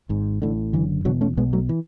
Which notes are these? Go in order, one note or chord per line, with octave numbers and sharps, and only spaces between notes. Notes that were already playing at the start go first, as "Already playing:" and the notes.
G#1 G#2
A1 A2 D3
F#1 F#2 D3 E3
E1 E2 B2 D3 F#3
A3 C#4
B1 B2 G#3 B3
F#3 A3
E3